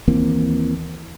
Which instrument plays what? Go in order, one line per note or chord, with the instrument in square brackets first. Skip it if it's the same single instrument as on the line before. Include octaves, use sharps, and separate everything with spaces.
[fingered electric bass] D#2 E3 A#3 C4